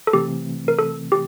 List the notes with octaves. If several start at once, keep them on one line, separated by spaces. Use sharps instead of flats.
A4
C3 E3 A3 C4 G4
A#4
A4
G4